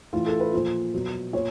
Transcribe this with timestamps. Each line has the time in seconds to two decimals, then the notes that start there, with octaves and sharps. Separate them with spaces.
0.13 A2 E3 F4
0.26 A4
0.40 B4
0.53 A#2 F3 C5
0.94 B2 F#3
1.33 A#2 C#5